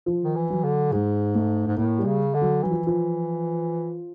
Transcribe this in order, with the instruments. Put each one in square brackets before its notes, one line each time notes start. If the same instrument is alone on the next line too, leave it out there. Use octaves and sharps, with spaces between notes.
[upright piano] F3
[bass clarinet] D#3
E3
[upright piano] F#3
[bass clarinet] D3
[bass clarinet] G#2 [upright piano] G#3
[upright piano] A3
[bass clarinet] G#2
[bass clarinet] A2 [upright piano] A#3
[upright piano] G3
[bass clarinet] C#3
D3
[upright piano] F#3
[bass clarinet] E3 [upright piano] F#3
[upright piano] F3
F3